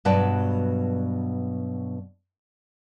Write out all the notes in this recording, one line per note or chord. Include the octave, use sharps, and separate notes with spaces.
G2 B2 F#3 B4 D5 A5